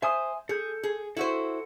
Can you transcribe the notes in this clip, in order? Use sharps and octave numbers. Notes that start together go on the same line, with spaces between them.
C5 E5 G#5 D#6
G#4 A4 G6
G#4
E4 F#4 A4 C5